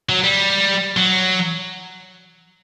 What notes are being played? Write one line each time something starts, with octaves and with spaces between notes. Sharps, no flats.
F#3
G3
F#3